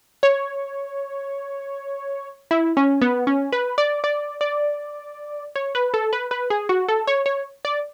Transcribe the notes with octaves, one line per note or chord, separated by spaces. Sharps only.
C#5
E4
C#4
B3
C#4
B4
D5
D5
D5
C#5
B4
A4
B4
B4
G#4
F#4
A4
C#5
C#5
D5